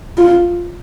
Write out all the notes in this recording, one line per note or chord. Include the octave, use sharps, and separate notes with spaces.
F4